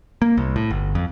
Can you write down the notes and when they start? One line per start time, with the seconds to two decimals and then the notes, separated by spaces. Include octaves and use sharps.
0.22 A#3
0.37 C2
0.56 A2
0.70 G1
0.95 F2